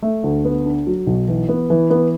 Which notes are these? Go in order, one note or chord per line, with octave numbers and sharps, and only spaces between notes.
A3
D2
B3
D4
F#3
B1
E3
B3
E3
B3